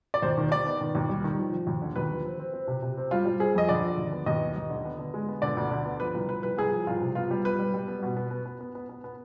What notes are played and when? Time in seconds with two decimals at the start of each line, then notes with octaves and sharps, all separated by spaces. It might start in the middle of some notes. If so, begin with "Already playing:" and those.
0.14 D5
0.22 D#2 C5
0.38 D#3
0.51 D#3 D5
0.66 B3
0.81 D#3
0.95 D#2
1.09 G3
1.24 D#3
1.38 F3
1.52 F3
1.67 D#2
1.82 D3
1.96 D#2 B4
2.10 F3
2.25 C4
2.39 C4
2.53 C4
2.68 C3
2.82 C3
2.97 C4
3.11 G3 F4
3.25 G3
3.40 C4 G#4
3.54 F2 D#5
3.69 D3 D5
3.83 F3
3.98 D#2
4.12 B3
4.26 D#2 D#5
4.41 B3
4.56 D#2
4.70 D3
4.85 B3
4.99 D3
5.14 G#3
5.29 B3
5.42 D3 D5
5.57 D2
5.71 D3
5.86 B3
6.00 F3 B4
6.14 C2
6.29 F3 B4
6.43 C2 B4
6.57 C2 G#4
6.72 F3
6.87 C2 F4
7.01 C3
7.15 B3 F4
7.31 G3
7.44 B3 B4
7.59 G3
7.74 G3
7.88 B3
8.03 B2
8.17 B3
8.31 B3
8.46 B3
8.61 B3
8.75 B3
8.89 B3
9.04 B3